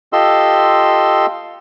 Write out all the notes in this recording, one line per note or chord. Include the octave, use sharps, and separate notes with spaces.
F4 G4 A4 D#5 C6 E6